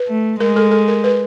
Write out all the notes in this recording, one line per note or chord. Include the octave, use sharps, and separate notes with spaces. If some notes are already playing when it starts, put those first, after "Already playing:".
Already playing: B4
A3
G#3 A#4
A4
A4
A#4
B4